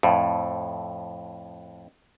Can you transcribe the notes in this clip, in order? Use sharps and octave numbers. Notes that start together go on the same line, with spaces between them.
F2 A2